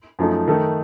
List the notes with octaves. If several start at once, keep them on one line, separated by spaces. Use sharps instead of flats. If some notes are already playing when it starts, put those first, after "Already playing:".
F#2 F3 A3 D#4
D#3 A3 D#4 A4